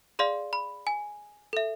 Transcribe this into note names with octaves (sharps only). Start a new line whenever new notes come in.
G#4 D5 F5 C6
B5
G#5
A4 E5